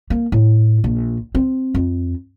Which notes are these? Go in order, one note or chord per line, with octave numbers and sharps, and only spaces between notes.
A#3
A2
A#1
C4
F2